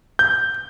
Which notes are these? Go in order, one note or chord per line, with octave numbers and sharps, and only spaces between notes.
G6